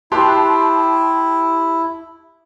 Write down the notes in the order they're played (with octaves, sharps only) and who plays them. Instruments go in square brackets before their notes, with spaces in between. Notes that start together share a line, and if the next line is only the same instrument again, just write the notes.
[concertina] E4 [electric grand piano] G4 [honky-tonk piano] A5 C6 F#6